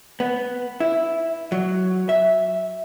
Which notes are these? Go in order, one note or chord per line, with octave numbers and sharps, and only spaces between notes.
B3
E4
F#3
E5